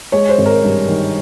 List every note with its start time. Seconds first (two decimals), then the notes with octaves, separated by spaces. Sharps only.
0.12 G#3 C#5
0.29 C5
0.38 G#1
0.46 A#4
0.63 G2
0.88 D#3